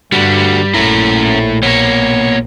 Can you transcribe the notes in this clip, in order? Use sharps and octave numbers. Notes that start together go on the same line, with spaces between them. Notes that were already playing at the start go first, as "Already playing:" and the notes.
G2 D3 G3 F#4
A#1 A3 C#4 E4 A#4
B2 A#3 C#5